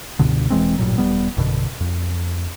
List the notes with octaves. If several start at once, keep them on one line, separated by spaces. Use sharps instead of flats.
C#2 G2 B2 D3
E1 E3 G#3 C4
A1 G2 A#2 F#3
E1 F#2 G3 B3
A1 F#2 B2 D3
F2